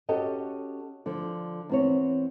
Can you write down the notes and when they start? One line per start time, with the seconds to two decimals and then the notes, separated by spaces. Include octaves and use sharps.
0.09 C#4 F#4 G4 A4 D#5
1.06 D3 F3
1.69 E2 C4 C#5